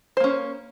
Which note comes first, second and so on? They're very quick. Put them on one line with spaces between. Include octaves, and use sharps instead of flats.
C5 A#3 C#4